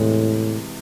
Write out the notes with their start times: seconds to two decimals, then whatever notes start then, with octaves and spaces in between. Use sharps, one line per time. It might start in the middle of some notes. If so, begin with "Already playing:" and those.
Already playing: E2 A2 C3 E3 G#3